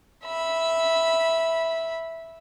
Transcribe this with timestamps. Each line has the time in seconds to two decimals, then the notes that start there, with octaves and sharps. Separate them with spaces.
0.24 E5 B5